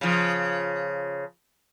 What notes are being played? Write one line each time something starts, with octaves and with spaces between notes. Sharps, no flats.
C#3 F3